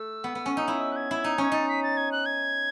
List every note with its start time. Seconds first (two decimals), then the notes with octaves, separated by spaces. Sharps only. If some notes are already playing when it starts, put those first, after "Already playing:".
Already playing: A3 E6
0.24 B3
0.35 B3
0.46 C#4
0.56 D#4 E6
0.68 E4 D#6
0.82 E6
0.92 F#6
0.96 G#6
1.11 E4
1.24 D#4
1.38 C#4
1.43 G#6
1.52 D#4 A6
1.69 B6
1.83 A6
1.97 G#6
2.12 F#6
2.26 G#6